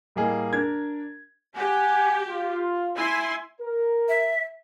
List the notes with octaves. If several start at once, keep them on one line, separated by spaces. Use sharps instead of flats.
A2 G3 A#3 G#4 D#5
D4 A#4 G#6
G4 F#5 G#5
F4
E4 G#5 C6
A#4
E5